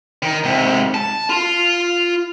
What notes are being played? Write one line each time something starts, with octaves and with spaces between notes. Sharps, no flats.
D#3
G#2 C3
A5
F4